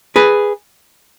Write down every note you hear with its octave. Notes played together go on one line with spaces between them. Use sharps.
G#4 B4